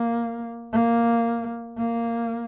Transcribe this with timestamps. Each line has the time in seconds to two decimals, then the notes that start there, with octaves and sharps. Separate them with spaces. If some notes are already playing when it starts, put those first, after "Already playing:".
Already playing: A#3
0.73 A#3
1.78 A#3